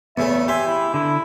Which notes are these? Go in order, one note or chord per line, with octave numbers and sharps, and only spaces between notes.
E2 C#3 A3 B3 E5
G4 E5 G#5 C6
E4
D3 E4